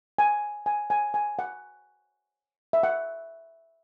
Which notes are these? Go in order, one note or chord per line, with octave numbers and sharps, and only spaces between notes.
G#5
G#5
G#5
G#5
F#5
E5
F#5